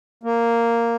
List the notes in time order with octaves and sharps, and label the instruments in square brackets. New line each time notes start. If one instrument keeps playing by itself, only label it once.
[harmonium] A#3